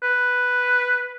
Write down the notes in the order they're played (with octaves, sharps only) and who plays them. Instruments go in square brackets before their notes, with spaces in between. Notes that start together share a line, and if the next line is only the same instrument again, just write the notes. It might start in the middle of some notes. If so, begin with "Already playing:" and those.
[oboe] B4